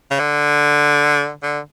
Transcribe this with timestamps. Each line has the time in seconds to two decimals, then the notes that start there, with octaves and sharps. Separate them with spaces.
0.11 C#3
0.19 D3
1.43 D3